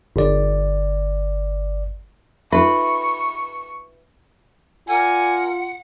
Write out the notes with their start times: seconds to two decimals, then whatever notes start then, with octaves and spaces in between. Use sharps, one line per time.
0.16 G1 D5
2.52 D#4 F4 B4 E5 C#6
4.88 F4 A#4 D5 F#5 G#5